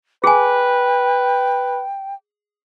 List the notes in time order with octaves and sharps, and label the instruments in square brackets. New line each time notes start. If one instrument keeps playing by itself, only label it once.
[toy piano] G#4 G#5 [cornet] B4 [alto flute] G5